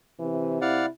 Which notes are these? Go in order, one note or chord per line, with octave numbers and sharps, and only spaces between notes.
C3 E3
E4 D5 F5 F#5